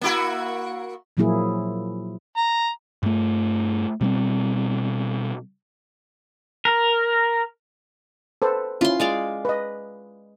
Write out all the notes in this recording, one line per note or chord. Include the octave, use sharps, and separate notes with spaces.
A#3 E4 F#4
A#2 F3 F#3 A#3 E4 G#4
A#5
G2 A3
B2 G3 A3 C4
A#4
A4 B4 C5
C#4 E4 F4 C6
G#3 D5 F5
B4 D#5